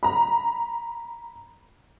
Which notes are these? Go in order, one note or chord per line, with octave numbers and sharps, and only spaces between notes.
A#5 B5